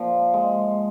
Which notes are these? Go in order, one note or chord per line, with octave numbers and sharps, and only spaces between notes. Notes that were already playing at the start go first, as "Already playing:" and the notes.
Already playing: A#2 F3
G#3